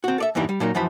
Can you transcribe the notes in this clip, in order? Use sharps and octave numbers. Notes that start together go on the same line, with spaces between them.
C4 F#4
A4 D5 E5
E2 G2 A#2 E3 G3 D#4
G3
A#2 F#3 D#4 A#4
F#2 E3 F3 C5 B5